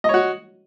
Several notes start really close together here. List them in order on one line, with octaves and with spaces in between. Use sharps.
D#5 C#5 F#4